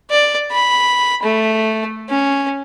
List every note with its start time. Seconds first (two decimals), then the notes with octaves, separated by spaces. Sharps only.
0.11 D5
0.52 B5
1.23 A3
2.09 C#4